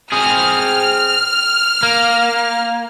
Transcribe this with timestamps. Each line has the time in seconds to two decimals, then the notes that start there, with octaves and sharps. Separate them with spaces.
0.12 C4 G#4 F6
1.83 A#3